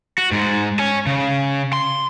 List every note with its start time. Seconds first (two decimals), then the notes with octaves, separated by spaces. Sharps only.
0.18 F#4
0.32 G#2 G#3
0.79 C#5 G#5
1.07 C#3
1.73 C6